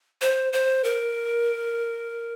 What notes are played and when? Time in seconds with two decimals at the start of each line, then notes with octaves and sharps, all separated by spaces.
0.21 C5
0.53 C5
0.84 A#4